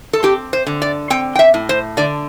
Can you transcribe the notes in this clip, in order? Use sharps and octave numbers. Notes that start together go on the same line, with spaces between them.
A4
C4 G4
C5
D3
D5
C4 G5
G5
E5
A2
C5
D3 D5